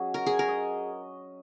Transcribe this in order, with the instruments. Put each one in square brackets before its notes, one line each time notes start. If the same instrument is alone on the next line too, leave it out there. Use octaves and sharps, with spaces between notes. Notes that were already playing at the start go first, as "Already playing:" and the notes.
Already playing: [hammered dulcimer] F#3 C#4 D#5 [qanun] G#4
[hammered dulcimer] F#4 [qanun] A#4
[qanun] G#4
A#4
[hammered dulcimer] D#5